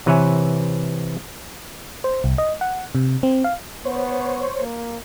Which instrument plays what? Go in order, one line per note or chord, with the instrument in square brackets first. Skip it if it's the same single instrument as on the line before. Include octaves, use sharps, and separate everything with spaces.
[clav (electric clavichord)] C3 E3 B4 C#5 E5 G#5
[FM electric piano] C5
C2
D#5
F#5
C3
C4
F5
[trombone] B3 [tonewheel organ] C5 C#5
[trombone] A#3